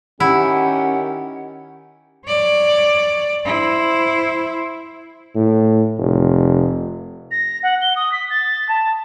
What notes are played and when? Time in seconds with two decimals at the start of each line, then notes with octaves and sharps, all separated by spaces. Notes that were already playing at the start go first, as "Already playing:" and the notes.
0.20 D#3 C#4 E4 G4 F#5
2.26 C#5 D5
3.45 E4 C5
5.35 A2
5.98 F1
7.31 A#6
7.63 F#5
7.81 G7
7.96 D#6
8.12 B6
8.30 A6
8.69 A5